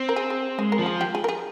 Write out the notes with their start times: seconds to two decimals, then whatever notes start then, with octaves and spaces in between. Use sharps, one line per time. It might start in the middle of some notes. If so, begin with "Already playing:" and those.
Already playing: C4
0.09 A#4
0.16 G#4
0.30 G#4
0.58 G#3 G#4
0.72 A#4
0.79 F3
0.86 G#4
1.01 G4
1.15 G#4
1.24 A#4
1.29 G#4